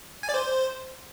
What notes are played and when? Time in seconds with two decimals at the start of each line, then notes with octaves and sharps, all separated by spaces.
0.23 G#5
0.29 D5
0.34 C5